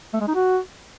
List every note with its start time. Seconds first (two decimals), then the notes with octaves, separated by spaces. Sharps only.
0.13 A3
0.20 G#3
0.28 D#4
0.35 F#4